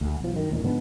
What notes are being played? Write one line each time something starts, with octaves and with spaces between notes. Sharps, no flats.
D2
B1 F3
F#2 D#3
A1 D#2 A#2 D#3
G#2 D3 F3 B3